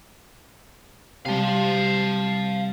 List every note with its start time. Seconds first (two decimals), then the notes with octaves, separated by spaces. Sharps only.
1.25 C3 G3 F5 A5